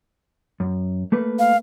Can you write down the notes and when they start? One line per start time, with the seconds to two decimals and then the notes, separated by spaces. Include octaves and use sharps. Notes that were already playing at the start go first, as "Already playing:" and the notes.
0.60 F#2
1.12 A3 A#3 B4
1.39 F5